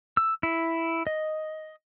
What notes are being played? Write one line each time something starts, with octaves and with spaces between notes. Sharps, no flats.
E6
E4
D#5